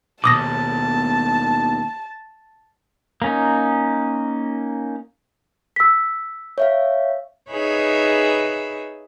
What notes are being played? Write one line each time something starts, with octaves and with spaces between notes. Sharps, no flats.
D#2 B2 A5 D6 D#6 A#6
A#3 C#4 D#4
E6 B6
C#5 E5 F5
D#4 G#4 B4 C#5 E5 B5